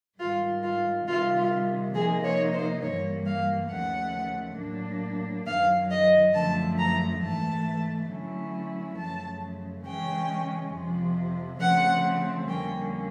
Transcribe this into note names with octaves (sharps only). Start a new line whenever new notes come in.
G#2 D#3 G3 F4
F4
C3 D#3 G3 F4
F4
C3 F3 A#3 D#4 G#4
C#5
C5
G2 E3 G3 A#3 C#5
F5
D#2 C#3 F3 A3 F#5
A2 F#3 A#3 D4
F#2 D#3 F#3 F5
D#5
F#2 D3 F3 A3 A5
A#5
G#2 E3 A3 A5
D3 F#3 A3 C#4 E4
F#2 C#3 F3 A3 A5
C#3 E3 G#3 C#4 G5
F2 C3 F3
C#3 F3 A3 C4 F#5
F2 D3 G3 A#3 C#4 G5